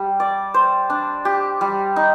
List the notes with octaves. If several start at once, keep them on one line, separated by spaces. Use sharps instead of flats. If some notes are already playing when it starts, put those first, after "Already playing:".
Already playing: G3
D5
C5
D4
G4
G3
D#4